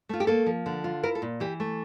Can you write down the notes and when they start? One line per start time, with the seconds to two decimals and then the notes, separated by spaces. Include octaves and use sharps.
0.09 A3 F4
0.20 G4
0.27 A#3 A4
0.46 F3
0.66 D3
0.84 F4
1.03 E4 A#4
1.15 A4
1.22 A#2
1.40 E3 G4
1.60 A3